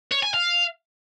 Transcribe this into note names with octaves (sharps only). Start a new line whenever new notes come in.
C#5
G#5
F5